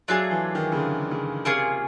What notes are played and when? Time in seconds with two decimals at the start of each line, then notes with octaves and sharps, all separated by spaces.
0.08 F#3 A3 D4 F4 G#4
0.31 E3
0.55 D#3
0.72 C#3
0.77 D3
1.11 C#3
1.45 C3 A#3 C#4 F4 G#4